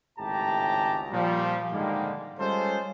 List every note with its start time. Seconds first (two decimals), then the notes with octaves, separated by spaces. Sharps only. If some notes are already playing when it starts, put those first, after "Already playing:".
0.18 G#1 C#2 A2 G4 A5 A#5
1.12 A#2 F3 G3
1.72 G#2 D3 D#3 G3 G#3 A#3
2.39 G3 G#3 C#4 F4 A4 C5